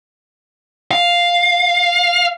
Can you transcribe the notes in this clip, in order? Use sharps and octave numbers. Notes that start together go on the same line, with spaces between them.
F5